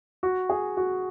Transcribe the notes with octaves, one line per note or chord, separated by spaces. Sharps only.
F#4
G#4
F#4